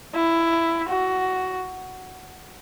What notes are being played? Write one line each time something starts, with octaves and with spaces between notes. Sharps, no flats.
E4
F#4